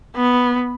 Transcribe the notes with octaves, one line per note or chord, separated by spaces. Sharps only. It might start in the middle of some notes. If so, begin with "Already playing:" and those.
B3